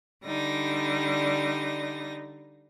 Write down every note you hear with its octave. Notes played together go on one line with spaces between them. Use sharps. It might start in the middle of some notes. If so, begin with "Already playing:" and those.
D3 G3 D#4 A#6